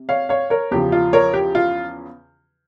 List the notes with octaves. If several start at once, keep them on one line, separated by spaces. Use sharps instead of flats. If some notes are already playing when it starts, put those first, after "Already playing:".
Already playing: C3
C#5 F5
C#5 F5
A#4 C#5
E2 C#3 F3 G4
F4
A#4 C#5
G4
F4